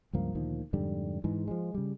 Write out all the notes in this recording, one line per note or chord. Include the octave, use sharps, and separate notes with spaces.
C#2 G2 F3 A#3
D2 A#2 D#3 F3
F2 G#2 D3 G3
G#2 E3 G#3
F3 G3 G#3
C#3 G3